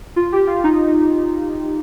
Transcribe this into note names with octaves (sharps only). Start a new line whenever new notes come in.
F4
G4
F4
D#4